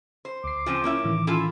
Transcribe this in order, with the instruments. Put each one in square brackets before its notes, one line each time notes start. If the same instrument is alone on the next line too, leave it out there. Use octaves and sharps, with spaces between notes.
[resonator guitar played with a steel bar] C5
[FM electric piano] D2 C7 [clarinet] D6
[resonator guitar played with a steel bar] C#3 F3 C4 [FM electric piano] F4
[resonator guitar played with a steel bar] A#3 C#4 E4
[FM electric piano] A2 D#3 E3
[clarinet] C#4 [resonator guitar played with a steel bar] E4 F4 A4